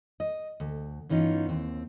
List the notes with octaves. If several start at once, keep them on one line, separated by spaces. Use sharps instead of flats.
D#5
D2
G2 E3 B3 C#4 D#4 F4
D#2 C4